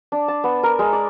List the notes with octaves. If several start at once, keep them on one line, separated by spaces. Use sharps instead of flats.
D4
A5
B3
A#4
G#3
D5